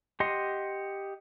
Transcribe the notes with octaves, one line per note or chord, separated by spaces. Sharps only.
G4 D#5 F#5 C6